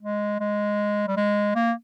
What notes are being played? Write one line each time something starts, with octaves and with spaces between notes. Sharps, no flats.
G#3
G#3
G3
G#3
A#3